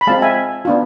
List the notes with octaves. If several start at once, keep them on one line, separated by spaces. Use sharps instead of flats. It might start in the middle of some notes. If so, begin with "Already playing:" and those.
B5
G#3 C4 F4 F5 A5
E5 G#5
B3 D4 F4